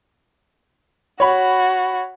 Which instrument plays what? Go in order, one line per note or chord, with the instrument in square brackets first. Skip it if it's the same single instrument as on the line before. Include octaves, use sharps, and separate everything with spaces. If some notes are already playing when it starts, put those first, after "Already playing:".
[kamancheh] F#4 [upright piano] C#5 B5